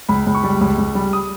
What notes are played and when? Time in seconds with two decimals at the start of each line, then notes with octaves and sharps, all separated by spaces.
0.09 C#2 B5
0.27 C#2
0.35 C#6
0.43 G3
0.61 C#2
0.78 C#2
0.95 G3
1.13 D#6